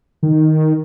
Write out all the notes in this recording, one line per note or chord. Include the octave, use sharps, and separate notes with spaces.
D#3